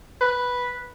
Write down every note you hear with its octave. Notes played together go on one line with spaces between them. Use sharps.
B4